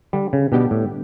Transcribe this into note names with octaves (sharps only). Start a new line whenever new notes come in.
D3 G3
C#3
B2 G3 B3 D4 G4
A2